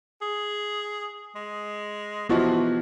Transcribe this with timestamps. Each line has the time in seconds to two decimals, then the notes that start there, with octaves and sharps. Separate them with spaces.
0.21 G#4
1.36 G#3
2.29 C3 E3 F3 B3 E4 F#4 D#5